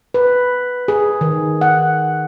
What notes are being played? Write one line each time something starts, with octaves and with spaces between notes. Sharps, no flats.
B4
G#4
D#3
F#5